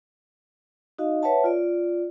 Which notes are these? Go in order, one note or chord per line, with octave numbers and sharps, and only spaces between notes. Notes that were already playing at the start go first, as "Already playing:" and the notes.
D#4 F#4 D#5 F5
B4 C#5 E5 F#5 A5
F4 D5